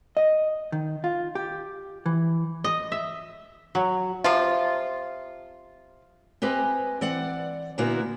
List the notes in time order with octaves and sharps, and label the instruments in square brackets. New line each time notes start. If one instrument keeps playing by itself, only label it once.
[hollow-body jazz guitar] D#5
D#3
F4
G4
E3
[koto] D#5
E5
F#3
[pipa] C3 F3 F4
[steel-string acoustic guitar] C4 G4 B4 D#5 G#5
E3 C4 D5 F#5
A#2 D3 A#3 B3 E4 F#4